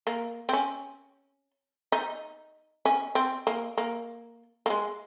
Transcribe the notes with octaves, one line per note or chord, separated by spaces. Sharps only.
A#3
C4
C#4
D#4
C#4
C4
A#3
A#3
A#3
G#3